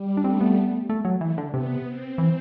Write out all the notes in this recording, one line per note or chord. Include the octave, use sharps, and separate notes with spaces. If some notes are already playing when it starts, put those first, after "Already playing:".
Already playing: G3
D4
A3 C4
B3
A3
F#3
E3 A3
D3
C3 B3
C4
E3